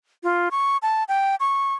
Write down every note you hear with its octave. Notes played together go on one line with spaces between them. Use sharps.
F4
C#6
A5
G5
C#6